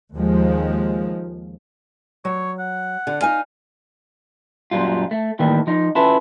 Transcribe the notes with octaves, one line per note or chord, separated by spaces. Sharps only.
D#2 F3 G#3
F#3 C#5
F#5
D3
D#4 F5 G#5
F#2 A#2 D#3 F#3 G3 F4
A3
A2 D#3 E3 G3 A#3
F3 D#4
C#4 E4 F4 A4 B4 A5